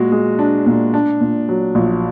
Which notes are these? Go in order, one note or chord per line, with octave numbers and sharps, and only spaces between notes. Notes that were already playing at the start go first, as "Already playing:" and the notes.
Already playing: A#2 G#3 F#4
G#3
D4
A#2
D4
A#2
F#3
A#1